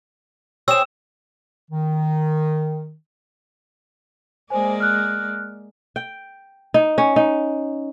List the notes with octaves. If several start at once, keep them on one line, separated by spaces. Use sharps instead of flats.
C4 G#4 C#5 E6 E7
D#3
G#3 A#3 C5 D5 G#5
F6 F#6
G5
D#4
C#4
D#4